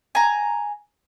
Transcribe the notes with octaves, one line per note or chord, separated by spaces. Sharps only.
G#5 A#5